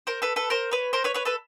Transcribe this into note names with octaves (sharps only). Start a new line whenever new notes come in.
A#4 C5
A4 B4
A4 B4
A#4 C5
B4 C#5
A#4 C5
B4 C#5
B4 C#5
A4 B4